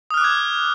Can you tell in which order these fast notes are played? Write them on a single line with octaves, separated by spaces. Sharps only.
D#6 F6 F#6 D6 G#6